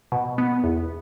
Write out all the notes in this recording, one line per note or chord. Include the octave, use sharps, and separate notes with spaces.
B2
B3
E2